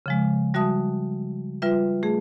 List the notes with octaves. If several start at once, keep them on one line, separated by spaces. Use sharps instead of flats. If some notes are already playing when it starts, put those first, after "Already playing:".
C#3 F3 G#3
G3 F#4 E5 A5 D#6
G3 F4 B4 E5
A3 G#4